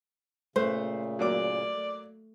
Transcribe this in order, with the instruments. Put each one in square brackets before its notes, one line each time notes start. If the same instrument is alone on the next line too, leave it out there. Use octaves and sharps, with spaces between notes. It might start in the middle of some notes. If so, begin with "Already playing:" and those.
[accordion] A#2 C#3 [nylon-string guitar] A3 [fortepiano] B4 C5
[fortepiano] F#3 A#3 D6 [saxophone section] D5